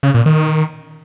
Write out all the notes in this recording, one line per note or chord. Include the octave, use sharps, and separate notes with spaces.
C#3
A#2
D#3